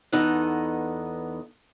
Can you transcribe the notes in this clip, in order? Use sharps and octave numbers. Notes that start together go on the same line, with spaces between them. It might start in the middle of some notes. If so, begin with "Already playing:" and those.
E2 B3 D#4 A4 D#5 F#5